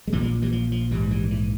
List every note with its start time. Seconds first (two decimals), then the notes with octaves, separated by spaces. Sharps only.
0.07 G#3
0.12 A#2 E3 G3
0.16 A#1
0.22 F3
0.42 E3 G3
0.52 F3
0.72 F3
0.91 A#1 G#2 E3 G3
1.11 E3 G3
1.31 E3